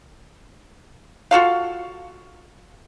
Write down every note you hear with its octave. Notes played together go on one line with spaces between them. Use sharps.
F4 F#4 A4 F5